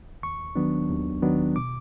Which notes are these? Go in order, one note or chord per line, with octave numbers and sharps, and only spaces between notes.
D#2 C#6
D#3 F#3 B3 D4
D#2
D#3 F#3 B3 D4
B2 D6